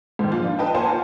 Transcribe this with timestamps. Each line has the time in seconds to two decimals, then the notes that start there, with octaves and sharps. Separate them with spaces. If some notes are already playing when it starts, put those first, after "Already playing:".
0.19 G#2 D#3
0.31 A#2 F3 F4
0.44 D4
0.59 B4 D#5 G5 A5
0.74 A#3 C5 F#5 G#5 A5
0.89 F4